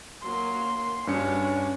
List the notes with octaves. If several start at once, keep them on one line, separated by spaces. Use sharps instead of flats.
F#3 A#3 A#4 C6
G2 C#4 D4 F#4 C#5 C#7